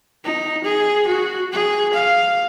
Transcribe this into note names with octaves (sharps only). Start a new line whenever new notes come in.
D#4
G#4
F#4
G#4
F5